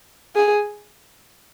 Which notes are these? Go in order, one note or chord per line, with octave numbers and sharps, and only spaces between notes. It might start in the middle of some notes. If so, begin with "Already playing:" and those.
G#4